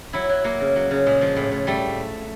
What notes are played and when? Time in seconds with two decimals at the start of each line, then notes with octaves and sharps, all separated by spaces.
0.13 F#3 E4
0.29 F#3
0.44 F#3 A#3
0.60 C#3
0.76 F#3
0.91 C#3
1.06 A#2 G#3
1.21 F3
1.36 A2
1.52 A2
1.67 G3 A3